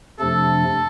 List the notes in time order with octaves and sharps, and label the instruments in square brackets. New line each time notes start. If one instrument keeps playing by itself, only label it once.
[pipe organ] F2 C3 F3 A3 D4 [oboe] A4